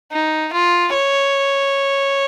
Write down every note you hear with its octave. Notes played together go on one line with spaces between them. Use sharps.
D#4
F4
C#5